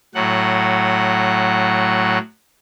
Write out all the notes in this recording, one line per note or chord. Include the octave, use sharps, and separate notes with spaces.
A2 F#3 F#5